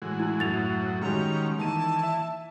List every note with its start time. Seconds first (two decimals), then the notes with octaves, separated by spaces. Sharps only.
0.02 A2 E3 G#3 F#4
0.20 E4
0.40 F#2 A2 F#3 A6 F7
1.02 D#3 G3 G#3 C#4 F#4 A#5
1.59 D#3 E3 A#3 A5 D#7
2.03 E5